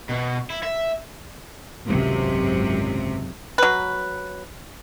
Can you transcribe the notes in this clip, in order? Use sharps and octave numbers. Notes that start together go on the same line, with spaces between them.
B2
E4
E5
G#1 C#2 F#2 C3 F#3
F#3 B4